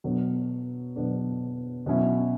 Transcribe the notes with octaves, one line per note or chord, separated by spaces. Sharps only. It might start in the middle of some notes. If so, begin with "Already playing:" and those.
B2 F#3 B3 D4
B2 F#3 B3 D4
B2 F#3 C#4 E4